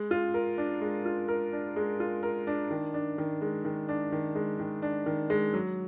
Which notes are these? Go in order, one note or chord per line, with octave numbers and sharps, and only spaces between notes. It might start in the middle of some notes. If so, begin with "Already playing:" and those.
Already playing: G#3
F4
A#4
D4
G#3
F4
A#4
D4
G#3
F4
A#4
D4
D#3
D4
D#3
G#3
D#3
D4
D#3
G#3
D#3
D4
D#3
G#3
F#3